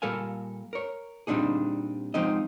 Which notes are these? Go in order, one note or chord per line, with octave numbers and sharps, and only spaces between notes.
A#2 G3 A4 A#4 F5 G#5
A#4 C#5
A#2 G3 C4 D4 D#4 G#4
F3 G#3 C4 D#4 D#5